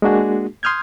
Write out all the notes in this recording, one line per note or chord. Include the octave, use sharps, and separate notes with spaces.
G#3 A#3 D4 F#4 G#4
C6 D#6 F6 G6 G#6